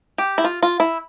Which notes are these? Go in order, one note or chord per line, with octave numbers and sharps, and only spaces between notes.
G4
E4
F4
F4
E4